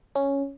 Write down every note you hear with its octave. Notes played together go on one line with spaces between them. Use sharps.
C#4